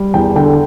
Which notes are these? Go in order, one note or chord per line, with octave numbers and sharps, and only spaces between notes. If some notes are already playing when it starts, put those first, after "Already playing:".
Already playing: G3
E2 G5
D3 G5